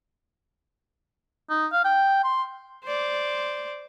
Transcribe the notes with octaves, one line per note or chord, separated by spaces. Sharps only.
D#4
F5
G5
C6
C5 D5